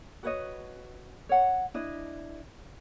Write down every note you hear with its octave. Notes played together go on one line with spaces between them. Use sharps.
F#4 B4 C#5 D#5
C#5 F#5
D4 E4 D#5